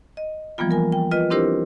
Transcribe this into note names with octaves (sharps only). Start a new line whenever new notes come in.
D#5
E3 F3 G3 A#3 B3 F4
A#4 G#5
G5
F4 B4 D#5
C4 D4 E4 G4 A#4 C5